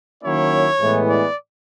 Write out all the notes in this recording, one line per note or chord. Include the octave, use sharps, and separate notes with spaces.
D#3 F#3 A#3 C#4 E4 C#5
A2 E3 G#3 B3
D5